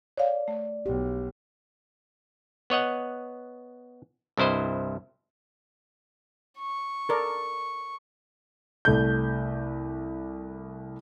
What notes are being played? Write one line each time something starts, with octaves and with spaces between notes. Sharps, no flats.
C#5 D5 F5
A3
B1 G4
B3 C#5 D#5 F#5
C2 G2 E4 C5 D#5
C#6
A4 A#4 D5
C2 A3 G6